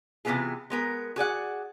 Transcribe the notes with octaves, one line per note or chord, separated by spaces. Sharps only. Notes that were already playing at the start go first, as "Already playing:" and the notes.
C3 E3 F#3 B3 F4 G#4
G#3 B3 A#4
F#4 G#4 D5 F#5